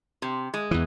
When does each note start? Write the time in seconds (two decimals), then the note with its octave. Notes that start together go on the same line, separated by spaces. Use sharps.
0.22 C3
0.54 G#3
0.71 E2 E3